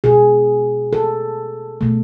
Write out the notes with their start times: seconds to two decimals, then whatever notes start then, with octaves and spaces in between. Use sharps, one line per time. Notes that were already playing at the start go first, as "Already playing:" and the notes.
0.04 B2 G#3 G#4
0.93 A4
1.81 B2 A3